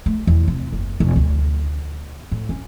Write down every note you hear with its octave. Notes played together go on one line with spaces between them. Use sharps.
A3
E2
C3
F#1
F1
D2
A2
C#4